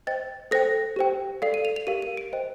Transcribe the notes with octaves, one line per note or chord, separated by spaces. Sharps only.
C5 D#5 G5 A6
A4 C5 G5 A#6
G4 C5 G5
A4 D5 F5 C7
D#7
F7
F7
G4 A#4 F5 D#7
D#7
D7
C5 D#5 G5